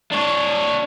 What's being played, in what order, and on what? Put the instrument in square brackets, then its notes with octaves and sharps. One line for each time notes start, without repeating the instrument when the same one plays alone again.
[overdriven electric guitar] D4 C#5